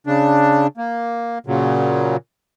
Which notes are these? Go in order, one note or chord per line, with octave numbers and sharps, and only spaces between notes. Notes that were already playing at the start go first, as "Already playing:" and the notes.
C#3 D4
A#3
A#2 C#3 F#3